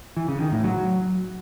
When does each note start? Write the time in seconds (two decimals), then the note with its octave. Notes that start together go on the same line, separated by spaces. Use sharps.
0.17 E3
0.28 C#3
0.40 D#3
0.52 A2
0.64 F#3